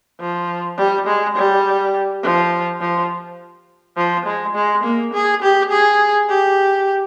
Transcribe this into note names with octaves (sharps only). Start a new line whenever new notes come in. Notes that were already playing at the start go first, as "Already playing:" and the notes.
F3
G3
G#3
G3
F3
F3
F3
G#3
G#3
A#3
G#4
G4
G#4
G4